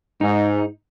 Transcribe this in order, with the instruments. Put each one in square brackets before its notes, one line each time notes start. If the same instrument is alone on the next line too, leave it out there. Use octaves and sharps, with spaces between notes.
[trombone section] G#2 [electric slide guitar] D#4